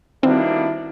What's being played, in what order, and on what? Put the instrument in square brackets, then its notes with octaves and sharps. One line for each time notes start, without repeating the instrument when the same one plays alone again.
[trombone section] B2 A#3 D4 [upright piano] D#3 G3 F#4 [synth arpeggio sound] C4 [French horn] E4